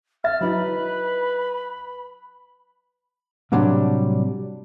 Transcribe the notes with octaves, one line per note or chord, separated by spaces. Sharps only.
E5 F6 A6
F#3 D#4 E4 B4 B5
A2 C3 F#3 G3 D4 G4